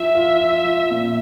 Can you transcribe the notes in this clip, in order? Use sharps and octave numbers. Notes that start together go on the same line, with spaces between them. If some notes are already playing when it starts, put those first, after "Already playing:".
Already playing: F3 E5
F4
F4
F3
A#2